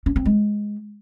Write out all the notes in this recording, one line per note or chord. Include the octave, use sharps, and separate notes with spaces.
C#4
C4
G#3